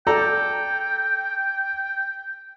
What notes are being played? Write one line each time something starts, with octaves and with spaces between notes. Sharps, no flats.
A4 D5 G5 A#5